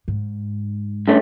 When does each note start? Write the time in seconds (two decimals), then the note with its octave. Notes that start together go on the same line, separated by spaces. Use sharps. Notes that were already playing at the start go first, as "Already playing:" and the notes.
0.08 G#2
1.08 G2 A3 C#4